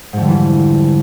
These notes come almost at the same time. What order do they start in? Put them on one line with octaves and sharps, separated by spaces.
G#2 F2 D3 G3 E3